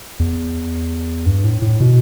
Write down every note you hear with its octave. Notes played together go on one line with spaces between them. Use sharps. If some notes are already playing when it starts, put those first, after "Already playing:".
E2
G2
A2
A2
B2